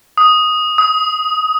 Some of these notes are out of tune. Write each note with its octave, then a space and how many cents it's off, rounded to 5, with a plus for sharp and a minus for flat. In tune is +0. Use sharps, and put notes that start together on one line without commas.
D#6 +0
D#6 +25